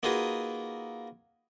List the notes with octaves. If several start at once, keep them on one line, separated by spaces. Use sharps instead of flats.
A#3 D#4 F4 F#4 G#4 B4